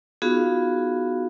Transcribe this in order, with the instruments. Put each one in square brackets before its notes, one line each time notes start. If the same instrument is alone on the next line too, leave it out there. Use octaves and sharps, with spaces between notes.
[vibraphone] B3 D#4 F4 F#4 G#4 F5